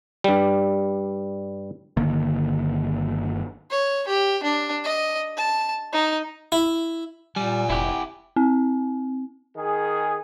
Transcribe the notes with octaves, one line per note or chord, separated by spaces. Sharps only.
G2 G3
G1 D3 D#3 A#3
C#5
G4
D4
D#5
A5
D#4
E4
A#2 G3 F#5 G#5
F1 E4 G4
C4
D#3 G#4